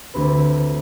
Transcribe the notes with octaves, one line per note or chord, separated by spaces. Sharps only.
D2 A3 C4 B4